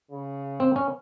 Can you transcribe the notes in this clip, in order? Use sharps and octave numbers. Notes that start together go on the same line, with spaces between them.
C#3
C4
C#4